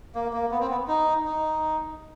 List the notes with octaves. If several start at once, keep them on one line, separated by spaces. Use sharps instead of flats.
A#3
A#3
B3
C4
B3
D#4
D#4